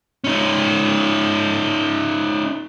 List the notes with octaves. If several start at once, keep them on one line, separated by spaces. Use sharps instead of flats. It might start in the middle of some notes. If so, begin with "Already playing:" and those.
C#4 D#4